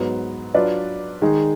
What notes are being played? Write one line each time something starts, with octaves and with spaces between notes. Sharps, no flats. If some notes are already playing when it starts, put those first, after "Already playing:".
Already playing: G#2 F#3 B3
F#3 D4 F4 B4 D5
D#3 G#3 D#4 G#4